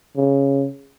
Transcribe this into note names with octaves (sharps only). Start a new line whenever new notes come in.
C#3